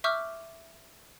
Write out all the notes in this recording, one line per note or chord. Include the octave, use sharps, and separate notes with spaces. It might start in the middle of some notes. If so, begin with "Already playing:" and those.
E5 C#6 D6 E6 F6 G6